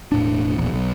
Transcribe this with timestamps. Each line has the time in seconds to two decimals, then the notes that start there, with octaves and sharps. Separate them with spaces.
0.12 E1 A2 D4
0.56 E1 A#1 E2
0.73 B1